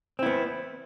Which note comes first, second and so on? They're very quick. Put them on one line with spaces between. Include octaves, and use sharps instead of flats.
C4 E4 B3